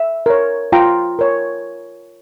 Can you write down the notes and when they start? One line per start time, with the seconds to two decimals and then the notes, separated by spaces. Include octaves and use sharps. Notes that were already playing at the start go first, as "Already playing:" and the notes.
Already playing: E5
0.26 A#4 C#5
0.72 F4 G5 A#5
1.19 A#4 C#5